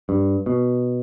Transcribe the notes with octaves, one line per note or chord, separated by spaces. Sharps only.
G2
B2